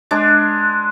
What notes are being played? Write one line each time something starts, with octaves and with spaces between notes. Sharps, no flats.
G#3 D4